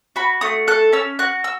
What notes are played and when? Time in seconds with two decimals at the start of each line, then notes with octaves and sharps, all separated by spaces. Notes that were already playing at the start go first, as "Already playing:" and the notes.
0.16 F#4 B5
0.41 A3 D#6
0.68 A4 F#6
0.93 C#4 E6
1.19 F#4 F#6
1.44 E6